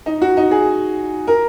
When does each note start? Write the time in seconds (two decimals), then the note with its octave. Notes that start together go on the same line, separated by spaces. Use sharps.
0.06 D#4
0.22 F#4
0.37 D#4
0.51 G#4
1.27 A#4